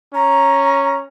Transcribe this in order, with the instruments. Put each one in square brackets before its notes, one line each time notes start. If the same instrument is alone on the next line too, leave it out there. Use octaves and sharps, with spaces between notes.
[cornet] C#4 [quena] A#5